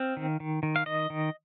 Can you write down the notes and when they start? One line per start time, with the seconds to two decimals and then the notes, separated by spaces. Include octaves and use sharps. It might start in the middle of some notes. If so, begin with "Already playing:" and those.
Already playing: C4 F5
0.17 D#3
0.40 D#3
0.63 D#3
0.76 F5
0.86 D#3 D#5
1.10 D#3